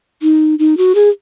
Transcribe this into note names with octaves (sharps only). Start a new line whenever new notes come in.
D#4
D#4
F#4
G#4